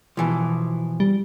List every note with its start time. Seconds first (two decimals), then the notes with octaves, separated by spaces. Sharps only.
0.17 B2 E3 F3
1.00 G3